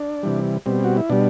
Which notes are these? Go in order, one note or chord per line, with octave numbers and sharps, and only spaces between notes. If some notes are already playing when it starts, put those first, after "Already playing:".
Already playing: D4
C3 E3 G3
B2 G3 C4
F#4
E4
B2 G3 D4